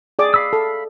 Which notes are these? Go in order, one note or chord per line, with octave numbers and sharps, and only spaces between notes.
G#4 D5 D6
F5 B5 E6
A4